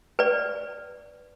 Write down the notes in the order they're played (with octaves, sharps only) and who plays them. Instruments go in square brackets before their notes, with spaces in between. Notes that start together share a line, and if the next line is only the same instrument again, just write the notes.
[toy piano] B4 D5